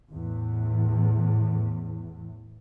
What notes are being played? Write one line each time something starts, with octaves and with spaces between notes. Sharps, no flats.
E2 A2